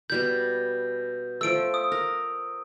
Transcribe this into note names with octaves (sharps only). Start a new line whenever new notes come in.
B2 G3 B4 G6
F3 A3 E6 D7
D#6
A#4